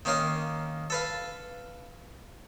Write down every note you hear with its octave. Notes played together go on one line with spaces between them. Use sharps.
D#3 A#3 C#4 F5 D#6
A4 B4 F5